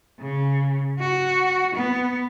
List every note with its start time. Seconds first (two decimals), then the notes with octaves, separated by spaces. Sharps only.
0.20 C#3
0.99 F#4
1.75 B3